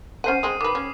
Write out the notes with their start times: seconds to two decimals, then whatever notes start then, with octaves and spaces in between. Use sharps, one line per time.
0.24 C#4 C5 F#5 C7 D#7
0.43 G#3 C4 D#6
0.61 D#3 B4 D6
0.75 C#4